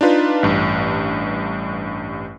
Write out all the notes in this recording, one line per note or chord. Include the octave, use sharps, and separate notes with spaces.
D4 D#4 F4 B4
A1 G2